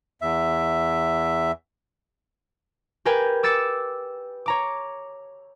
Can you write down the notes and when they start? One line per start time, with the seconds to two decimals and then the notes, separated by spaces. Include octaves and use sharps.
0.22 E2 E5
3.05 G4 A#4 B4 G5 G#5
3.43 D6 E6 A6 C#7 E7
4.46 C#5 A#5 D6